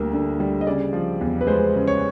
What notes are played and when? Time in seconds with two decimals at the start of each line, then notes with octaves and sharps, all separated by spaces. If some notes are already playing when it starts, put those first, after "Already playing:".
Already playing: D2 D3 G3 A#3
0.13 D3
0.40 G3
0.61 D#5
0.67 C#3 D5
0.93 F3
1.21 E2
1.41 B4
1.47 G#3 C5
1.74 C#3
1.87 C#5